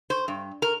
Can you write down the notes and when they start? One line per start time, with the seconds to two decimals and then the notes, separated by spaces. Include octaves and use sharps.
0.10 C5
0.28 G2
0.62 A#4